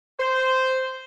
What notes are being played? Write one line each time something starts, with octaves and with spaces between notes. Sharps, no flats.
C5